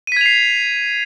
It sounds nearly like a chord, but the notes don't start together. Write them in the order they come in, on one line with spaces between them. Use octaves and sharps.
D#7 B6 G#6 F7 C7